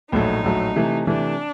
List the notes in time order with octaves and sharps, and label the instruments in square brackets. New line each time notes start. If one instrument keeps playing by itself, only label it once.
[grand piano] A#1 A2 F#3 A3 [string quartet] D#4
[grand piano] A#1 A2 F#3 A3
C3 E3 A3
[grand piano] C3 E3 A3 [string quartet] D4